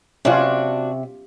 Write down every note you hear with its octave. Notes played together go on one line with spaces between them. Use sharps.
C3 C#4 D4 F4 F#4